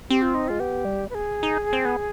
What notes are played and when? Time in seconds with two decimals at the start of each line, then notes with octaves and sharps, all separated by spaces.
0.10 C4 G4
0.22 F4
0.34 D#4
0.48 G#3 F4
0.60 B3 G4
0.85 G3
1.10 B4
1.15 G#4
1.43 D#4
1.73 C4
1.85 B3